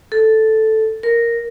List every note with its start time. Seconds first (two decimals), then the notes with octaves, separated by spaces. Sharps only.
0.12 A4
1.03 A#4